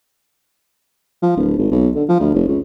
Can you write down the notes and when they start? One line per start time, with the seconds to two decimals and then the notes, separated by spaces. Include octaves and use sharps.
1.23 F3
1.37 D1
1.58 G#1
1.71 B1
1.95 D3
2.09 F3
2.20 D2
2.34 F1
2.48 C#2